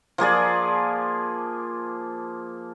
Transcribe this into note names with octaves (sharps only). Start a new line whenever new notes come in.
F3 A#3 G#4 D5